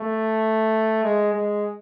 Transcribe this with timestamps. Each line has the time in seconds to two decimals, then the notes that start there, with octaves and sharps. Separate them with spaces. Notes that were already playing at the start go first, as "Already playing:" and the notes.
Already playing: A3
1.03 G#3
1.33 G#3